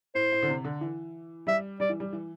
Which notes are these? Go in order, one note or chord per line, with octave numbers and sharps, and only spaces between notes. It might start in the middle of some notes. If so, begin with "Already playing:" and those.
A2 C5
A2
D3
C3
D3
E3
G3 E5
G3 D5
E3
G3
E3